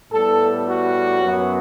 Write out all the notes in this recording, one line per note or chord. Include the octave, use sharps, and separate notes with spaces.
A2 G3 B3 A4
F#4
F#2 F#3 B3